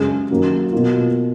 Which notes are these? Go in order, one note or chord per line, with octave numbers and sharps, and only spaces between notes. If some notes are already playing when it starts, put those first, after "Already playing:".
Already playing: F#2 C#3 G#3
F#2 D#3 F#3 A#3
B2 A#3 F4